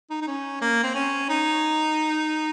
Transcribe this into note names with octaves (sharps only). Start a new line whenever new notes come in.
D#4
D#4
C#4
A#3
C4
C#4
D#4